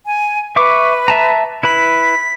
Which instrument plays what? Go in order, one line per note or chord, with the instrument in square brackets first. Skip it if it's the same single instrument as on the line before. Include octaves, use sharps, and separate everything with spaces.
[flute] G#5
[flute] B4 [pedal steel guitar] E5 C#6 D6
[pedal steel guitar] E5 A5 A#5
[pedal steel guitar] E4 B4 B5 [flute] B6